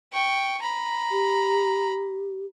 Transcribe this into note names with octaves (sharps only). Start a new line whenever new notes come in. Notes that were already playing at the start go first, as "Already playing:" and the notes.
G5 C#6
A#5 B5
G4